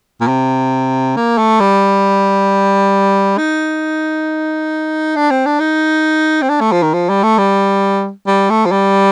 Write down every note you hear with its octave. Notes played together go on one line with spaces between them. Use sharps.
A#2
C3
A#3
A3
G3
D#4
D4
C4
D4
D#4
C4
D4
A3
F3
D#3
F3
G3
A3
G3
G3
A3
F3
G3